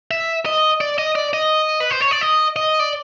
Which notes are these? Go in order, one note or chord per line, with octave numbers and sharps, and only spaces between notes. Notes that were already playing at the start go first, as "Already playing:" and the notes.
E5
D#5
D5
D#5
D5
D#5
B4
C5
C#5
D5
D#5
D#5
D5